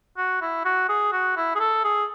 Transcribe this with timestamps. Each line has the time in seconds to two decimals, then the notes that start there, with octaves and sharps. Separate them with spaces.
0.17 F#4
0.42 E4
0.65 F#4
0.89 G#4
1.12 F#4
1.37 E4
1.55 G#4
1.60 A4
1.84 G#4